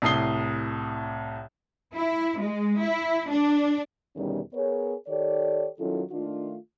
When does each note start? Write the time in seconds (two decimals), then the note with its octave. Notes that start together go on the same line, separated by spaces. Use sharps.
0.02 C2 A2 D#6 C7 G7
1.93 E4
2.38 G#3
2.81 E4
3.29 D4
4.16 E2 B2 D3 D#3 G3 C#4
4.53 B3 G#4 A#4 C#5
5.08 D#3 G4 A4 C#5 D5
5.79 D#3 F#3 C#4 E4 F4 A4
6.11 D#3 A3 D4 F4